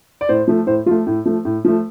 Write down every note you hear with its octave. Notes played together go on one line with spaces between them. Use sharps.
D5
A2 C5
F3 A3
A2 C5
F3 A3 F4
A2
F3 A3
A2
F3 A3